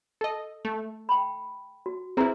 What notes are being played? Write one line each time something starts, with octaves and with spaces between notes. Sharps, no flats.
A4 D#5
A3
G5 B5
F#4
C4 E4 G#4 B4 A#5